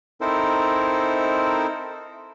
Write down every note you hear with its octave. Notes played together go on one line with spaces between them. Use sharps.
C4 D#4 E4 A4 A#4 C5